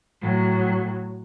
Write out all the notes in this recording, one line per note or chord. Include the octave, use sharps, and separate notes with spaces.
A2 F#3